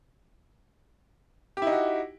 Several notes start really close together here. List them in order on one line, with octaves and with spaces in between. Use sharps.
G4 E4 D#4 F#4